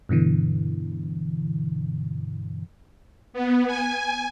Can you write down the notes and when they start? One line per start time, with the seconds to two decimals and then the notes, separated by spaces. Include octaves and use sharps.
0.09 G2 B2 D3 E3
3.33 B3
3.67 G#5